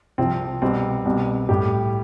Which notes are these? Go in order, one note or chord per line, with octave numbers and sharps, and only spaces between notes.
C2 C3 F3 C4
C2 B2 G3 C4
C2 B2 G3
A2 G3 G4